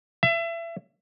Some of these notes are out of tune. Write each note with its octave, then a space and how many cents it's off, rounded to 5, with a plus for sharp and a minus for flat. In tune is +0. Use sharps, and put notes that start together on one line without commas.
E5 +30